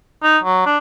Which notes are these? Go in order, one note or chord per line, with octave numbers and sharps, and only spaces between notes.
D#4
F#3
D4